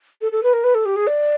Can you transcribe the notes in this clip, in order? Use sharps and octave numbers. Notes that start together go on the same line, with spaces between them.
A4
A4
B4
A#4
B4
A4
G4
G#4
D5